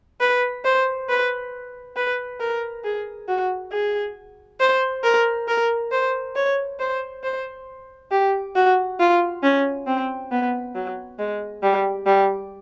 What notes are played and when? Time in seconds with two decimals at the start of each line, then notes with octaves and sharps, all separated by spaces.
0.20 B4
0.64 C5
1.09 B4
1.96 B4
2.40 A#4
2.84 G#4
3.28 F#4
3.72 G#4
4.60 C5
5.04 A#4
5.48 A#4
5.92 C5
6.36 C#5
6.80 C5
7.24 C5
8.11 G4
8.55 F#4
9.00 F4
9.43 C#4
9.87 C4
10.31 B3
10.75 F#3
11.19 G#3
11.63 G3
12.06 G3